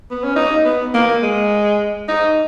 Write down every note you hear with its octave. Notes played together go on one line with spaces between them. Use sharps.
B3
C#4
D#4
B3
A#3
G#3
D#4